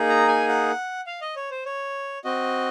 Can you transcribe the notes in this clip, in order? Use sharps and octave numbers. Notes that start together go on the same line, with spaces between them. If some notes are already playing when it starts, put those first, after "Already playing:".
Already playing: A#3 D#4 G#4
A#5
G#5
F#5
F5
D#5
C#5
C5
C#5
C4 F#4 D#5